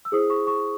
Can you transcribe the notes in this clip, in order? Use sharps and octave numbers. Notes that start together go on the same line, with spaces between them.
E6
E4 G#4 C5 D#6
C#6
C#6